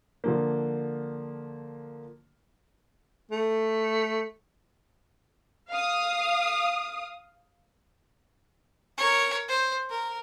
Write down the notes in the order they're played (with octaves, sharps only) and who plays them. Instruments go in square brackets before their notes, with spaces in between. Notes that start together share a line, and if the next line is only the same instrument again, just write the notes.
[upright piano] D3 F3 A#3
[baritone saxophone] A3
[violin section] F5 D#6
[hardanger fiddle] A#4 C#5
C5
A#4